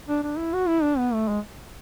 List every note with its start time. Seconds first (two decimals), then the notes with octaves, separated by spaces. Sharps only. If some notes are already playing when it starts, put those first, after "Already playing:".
0.09 D4
0.23 D4
0.38 E4
0.54 F#4
0.68 E4
0.83 D4
0.98 B3
1.13 A3
1.28 G#3